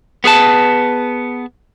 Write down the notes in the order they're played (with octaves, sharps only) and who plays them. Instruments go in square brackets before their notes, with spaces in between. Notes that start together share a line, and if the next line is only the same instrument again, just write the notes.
[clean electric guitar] B3 G#4 B4 A5